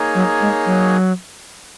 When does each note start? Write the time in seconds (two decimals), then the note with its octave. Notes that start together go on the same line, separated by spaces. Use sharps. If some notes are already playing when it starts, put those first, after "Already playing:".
Already playing: A#3 D#4 G#4 C#5
0.15 F#3
0.41 G#3
0.66 F#3